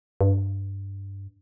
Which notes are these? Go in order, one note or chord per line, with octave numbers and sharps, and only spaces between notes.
G2